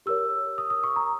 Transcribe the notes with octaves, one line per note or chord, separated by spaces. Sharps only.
G4 A#4 C#5 E6
D#6
D#6
C#6
A#5